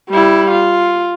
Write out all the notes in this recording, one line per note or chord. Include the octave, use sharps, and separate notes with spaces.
G3 E4
F4